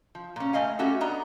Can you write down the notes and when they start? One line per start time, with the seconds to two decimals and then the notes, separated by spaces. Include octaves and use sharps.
0.15 F3
0.36 A#2 C#4
0.53 A3 D#5 F5 G#5
0.79 A3 C#4 F#4 G4 A4
1.01 B3 D4 D#5 A#5